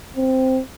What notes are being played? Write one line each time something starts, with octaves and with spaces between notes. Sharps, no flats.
C4